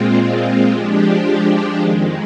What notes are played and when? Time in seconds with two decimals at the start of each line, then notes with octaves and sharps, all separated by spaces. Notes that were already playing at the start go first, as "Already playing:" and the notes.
Already playing: A#2 G#3 C4 F4
0.72 F3 G#3 D4 G4
1.78 F2 D#3 G#3